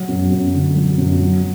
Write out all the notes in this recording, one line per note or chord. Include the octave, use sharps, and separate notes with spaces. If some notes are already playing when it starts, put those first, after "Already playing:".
Already playing: F#3
F#2
F#2
D3
F#3
F#2
F#3